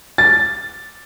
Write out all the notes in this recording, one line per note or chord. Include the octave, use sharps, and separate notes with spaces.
A6